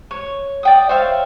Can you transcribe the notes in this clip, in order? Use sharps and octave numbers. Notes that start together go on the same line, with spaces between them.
C#5
D5 G5 D#6
C5 C#5 E5 F5